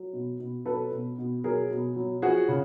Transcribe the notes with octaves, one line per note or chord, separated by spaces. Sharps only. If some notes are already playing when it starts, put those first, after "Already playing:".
Already playing: F#3
B2
B2
F#3 A4 B4
B2
B2
F#3 G#4 A#4
B2
F#3
F3 F#4 G#4
C#3